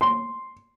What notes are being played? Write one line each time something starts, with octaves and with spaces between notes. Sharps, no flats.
C6